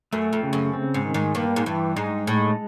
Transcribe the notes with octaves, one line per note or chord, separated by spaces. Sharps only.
F#2 A3
F2
C#3
F#2
C4
G#2
D#3
G#2
G2 A#3
G#2
G2 E3
G#2 D#4
A2 G#3